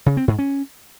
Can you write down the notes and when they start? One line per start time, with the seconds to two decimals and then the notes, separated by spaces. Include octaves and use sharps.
0.06 C#3
0.17 C4
0.28 G#2
0.39 C#4